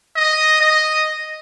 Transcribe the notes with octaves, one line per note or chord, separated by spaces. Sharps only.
D#5
D#5